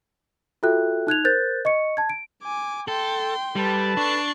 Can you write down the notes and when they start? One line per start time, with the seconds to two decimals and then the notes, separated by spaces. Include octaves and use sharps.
0.63 F4 F#4 A4 E5 G5 F#6
1.07 D#4 F#6 G#6 F7
1.24 A#4 C5 F#6 G6 A6
1.65 D#5 C#6 C#7
1.97 A5 G#6
2.10 D7
2.43 G#5 D6
2.88 A4 G5 C6
3.56 G3 A4 B4 A5
3.97 D4 C#6 C7